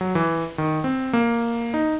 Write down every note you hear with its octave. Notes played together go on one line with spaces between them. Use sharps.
F#3
E3
D#3
C4
A#3
D#4